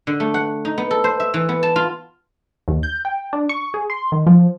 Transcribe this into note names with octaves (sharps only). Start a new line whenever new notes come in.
D3
A3
F#5
D#4
B3
A4
C5
E5
E3
B3
A5
F4
D#2
G6
G5
D4
C#6
G#4
C6
D#3
F3